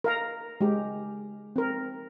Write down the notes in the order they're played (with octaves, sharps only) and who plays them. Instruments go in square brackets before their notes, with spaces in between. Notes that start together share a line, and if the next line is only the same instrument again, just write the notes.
[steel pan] A#4 F5 A#5
G#3 G4
C4 A#4